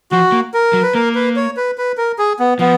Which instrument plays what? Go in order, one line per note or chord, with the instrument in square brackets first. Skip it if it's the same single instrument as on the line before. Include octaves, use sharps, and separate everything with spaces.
[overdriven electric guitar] F3 [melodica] F#4
[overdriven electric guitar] A#3
[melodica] A#4
[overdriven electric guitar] F#3
[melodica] B4
[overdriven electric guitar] A#3 [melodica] A#4
[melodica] B4
C#5
B4
B4
A#4
G#4
B3
[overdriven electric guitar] F3 [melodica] B3